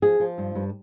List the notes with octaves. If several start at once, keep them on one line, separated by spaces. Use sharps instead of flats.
F3 G#4
F3
G2
G2